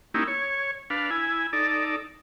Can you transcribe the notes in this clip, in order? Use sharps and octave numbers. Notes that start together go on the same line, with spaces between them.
A#3 C#4 D#4 E4 G4
C#5
D4 B4 F5
E4 G#5
D#4 A4 D5